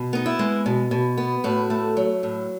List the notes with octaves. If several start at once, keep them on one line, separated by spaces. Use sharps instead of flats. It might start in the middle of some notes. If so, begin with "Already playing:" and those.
Already playing: B2
B3 D#4
E4
G#3
B2
B2
B3
A2 F#4
A3
F#3
A2